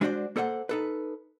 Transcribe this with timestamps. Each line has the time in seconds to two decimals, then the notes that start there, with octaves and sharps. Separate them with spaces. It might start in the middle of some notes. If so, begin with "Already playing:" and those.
0.01 G#3 D4 F#4 A4 C5 D5
0.36 A#3 A4 C5 D#5 F#5
0.69 D#4 A4 B4